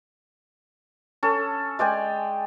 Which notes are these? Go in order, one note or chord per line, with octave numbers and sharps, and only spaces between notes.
C#4 A4
G#3 D5 G5 G#5